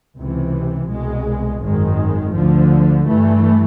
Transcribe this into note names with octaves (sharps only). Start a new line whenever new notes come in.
C#2 C3 E3
C2 B2 G#3
G#1 F#2 D#3 G#3
D2 D3 F3
G2 E3 A3